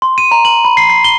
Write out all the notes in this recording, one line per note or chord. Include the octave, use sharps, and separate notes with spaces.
C6
D#7
A#5
F#7
B5
C7
C7
G7